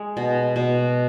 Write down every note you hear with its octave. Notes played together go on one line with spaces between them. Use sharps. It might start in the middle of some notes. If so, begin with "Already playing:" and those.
Already playing: G#3
B2
B2